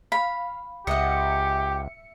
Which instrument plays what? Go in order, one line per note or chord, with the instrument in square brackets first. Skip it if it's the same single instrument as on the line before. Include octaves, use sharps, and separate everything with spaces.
[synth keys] F5 [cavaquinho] B5
[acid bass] C#2 [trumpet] G4 [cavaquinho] D#5 F#5 [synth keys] E5 C#7